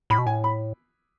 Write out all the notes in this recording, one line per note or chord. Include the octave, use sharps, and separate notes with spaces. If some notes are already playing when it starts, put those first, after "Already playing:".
A2 B5
B2
A2 G#5
B5